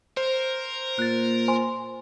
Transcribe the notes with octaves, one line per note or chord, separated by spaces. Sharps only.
A#4 C5
A#2 F#6 A6
C5 G#5 C6